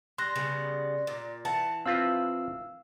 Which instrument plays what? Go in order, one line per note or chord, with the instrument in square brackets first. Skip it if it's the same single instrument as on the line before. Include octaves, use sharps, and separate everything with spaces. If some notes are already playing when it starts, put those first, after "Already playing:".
[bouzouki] G3 [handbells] C6 F#6 A#6
[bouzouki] C#3 G3 B3
A#2
E3 F#5 A5
[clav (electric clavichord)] C4 F4 B4 [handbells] F5 E6